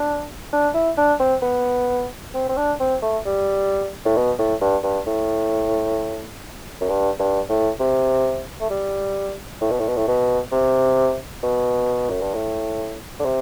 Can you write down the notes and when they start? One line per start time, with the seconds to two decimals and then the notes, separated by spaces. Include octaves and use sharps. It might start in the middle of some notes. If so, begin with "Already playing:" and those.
Already playing: D4
0.53 D4
0.74 E4
0.98 D4
1.20 C4
1.42 B3
2.34 C4
2.49 C4
2.57 D4
2.80 C4
3.02 A3
3.25 G3
4.05 A2
4.16 B2
4.39 A2
4.61 G2
4.83 G2
5.07 A2
6.81 F#2
6.89 G2
7.19 G2
7.49 A2
7.80 C3
8.60 A3
8.70 G3
9.61 A2
9.71 B2
9.79 A2
9.88 B2
9.97 A2
10.08 B2
10.52 C3
11.43 B2
12.09 F#2
12.21 G2
12.34 A2
13.20 D3
13.25 C3